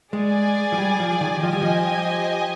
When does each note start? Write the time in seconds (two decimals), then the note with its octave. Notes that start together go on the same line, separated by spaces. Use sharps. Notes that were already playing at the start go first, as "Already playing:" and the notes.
0.13 G#3 G#4 D5 G#5
0.72 F3
0.78 G3
1.00 F3
1.21 D#3
1.43 F3 G4 C5 D#5 G#5
1.53 G3
1.62 F3